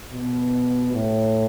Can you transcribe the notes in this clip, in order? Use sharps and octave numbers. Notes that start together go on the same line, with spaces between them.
B2
A2